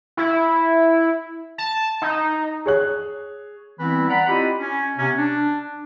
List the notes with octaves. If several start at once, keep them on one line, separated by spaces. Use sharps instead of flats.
E4
A5
D#4
G#4 C#5 F#6
E3 G3 B3 C4 E4 B4
D5 F#5 A#5 B5
C4 E4 F4 G4 D#5 B5
C#4
C3 B3 C#4
D4